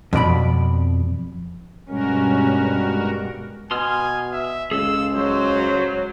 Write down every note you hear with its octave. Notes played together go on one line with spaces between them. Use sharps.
F2 B2 D5 B5
G2 B2 G3 G#3 C#4 F#4 A#4
B2 G#5 C6 D#6 F6
E5
C#2 G#4 A4 F5 E6
F#3 C5